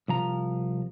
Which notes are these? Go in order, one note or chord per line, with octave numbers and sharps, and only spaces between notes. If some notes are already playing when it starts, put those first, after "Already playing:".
C2 F3 A#5